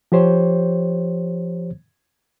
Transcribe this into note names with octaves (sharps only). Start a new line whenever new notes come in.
F3 G4 C5 C#5